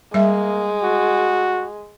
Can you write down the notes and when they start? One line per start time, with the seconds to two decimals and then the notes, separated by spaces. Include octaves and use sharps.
0.14 G3 G#3 A#3 E5
0.84 F#4